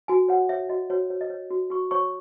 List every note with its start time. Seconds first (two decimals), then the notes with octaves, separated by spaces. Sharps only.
0.08 F#4 G#5
0.28 C#5 F#5
0.49 C#5 E5
0.69 F#4 D#5
0.90 F#4 C#5
1.10 C#5
1.21 D#5
1.30 C#5
1.50 F#4
1.70 F#4 C#6
1.91 C#5 C#6